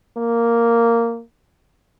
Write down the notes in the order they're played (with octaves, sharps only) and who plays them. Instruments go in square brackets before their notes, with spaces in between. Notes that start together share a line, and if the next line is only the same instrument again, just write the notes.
[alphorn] A#3